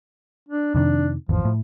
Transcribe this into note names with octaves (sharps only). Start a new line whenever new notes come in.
D4
F2 C3 D#3 D4
G#1 E2 F3
A2